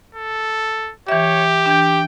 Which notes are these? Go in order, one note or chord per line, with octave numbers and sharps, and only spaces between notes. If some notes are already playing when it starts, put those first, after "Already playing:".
A4
E3 G4 C#5 E5
E3 D4 G5